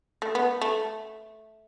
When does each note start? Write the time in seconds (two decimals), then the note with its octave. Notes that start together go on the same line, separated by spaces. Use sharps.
0.22 A3
0.35 B3
0.61 A3